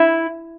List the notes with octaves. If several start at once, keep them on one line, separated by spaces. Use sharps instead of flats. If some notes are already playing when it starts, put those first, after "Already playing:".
Already playing: E4